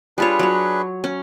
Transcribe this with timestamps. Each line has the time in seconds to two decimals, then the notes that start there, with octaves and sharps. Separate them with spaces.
0.18 G3 D4 F4 G#4 B4 C#5
0.39 F#3 C#5
1.04 C#4